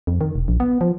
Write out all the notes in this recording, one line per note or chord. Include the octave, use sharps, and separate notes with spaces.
F2
D#3
E1
A#1
B3
F3